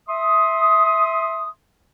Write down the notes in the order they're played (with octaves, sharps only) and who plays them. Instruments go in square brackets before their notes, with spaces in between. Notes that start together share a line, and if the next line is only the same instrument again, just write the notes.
[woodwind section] E5 C6 D#6